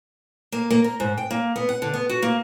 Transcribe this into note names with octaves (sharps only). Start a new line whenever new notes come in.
A#3
A#3
A#4
G#2
G5
A#3
B3
F#5
D3
B3
F#4
A#3